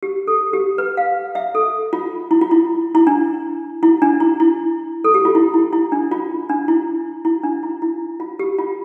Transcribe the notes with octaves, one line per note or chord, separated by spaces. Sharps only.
G4
A4
G4
B4
F5
E5
A4
F4
E4
F4
E4
E4
D4
E4
D4
E4
E4
A4
G4
F4
E4
E4
E4
D4
F4
D4
E4
E4
D4
E4
E4
F4
G4
F4